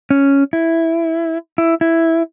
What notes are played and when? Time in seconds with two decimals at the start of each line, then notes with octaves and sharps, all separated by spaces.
0.10 C#4
0.53 E4
1.58 E4
1.81 E4